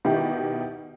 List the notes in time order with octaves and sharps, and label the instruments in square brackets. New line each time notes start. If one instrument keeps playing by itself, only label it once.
[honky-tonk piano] B2 D#3 E4 G4